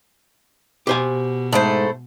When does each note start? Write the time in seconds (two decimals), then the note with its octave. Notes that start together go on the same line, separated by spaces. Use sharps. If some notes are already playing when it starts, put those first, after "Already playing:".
0.87 B2 G4 C5 G#5
1.53 G#2 A3 E4 C5